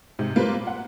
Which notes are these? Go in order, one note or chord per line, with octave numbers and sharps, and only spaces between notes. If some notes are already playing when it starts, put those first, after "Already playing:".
G#2 C3
G3 A#3 F4 B4 C5
A#2
F#5